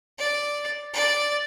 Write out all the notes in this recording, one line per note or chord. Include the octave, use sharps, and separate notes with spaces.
D5
D5